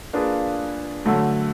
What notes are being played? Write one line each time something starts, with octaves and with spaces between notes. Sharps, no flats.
A#3 D4 F4 G#4 B4
D3 F#3 A3